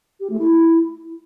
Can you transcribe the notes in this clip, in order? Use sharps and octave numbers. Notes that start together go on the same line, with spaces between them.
G4
A3
E4